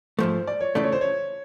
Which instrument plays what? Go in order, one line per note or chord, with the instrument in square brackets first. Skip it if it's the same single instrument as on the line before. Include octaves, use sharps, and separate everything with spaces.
[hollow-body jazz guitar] G#2 F3 A3 [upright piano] C5
[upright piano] D5
C#5
[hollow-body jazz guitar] C#2 C#3 E3 A3 [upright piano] D5
[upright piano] C#5
C5
C#5